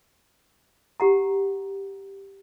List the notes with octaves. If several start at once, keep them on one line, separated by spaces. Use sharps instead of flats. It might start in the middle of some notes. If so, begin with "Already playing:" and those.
G4 F#5 A#5